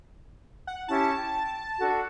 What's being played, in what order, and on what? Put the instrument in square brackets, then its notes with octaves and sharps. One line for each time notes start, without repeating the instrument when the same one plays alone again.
[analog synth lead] F#5
[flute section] C#4 E4 G4 [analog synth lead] A5
[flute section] G5
D4 F#4 A4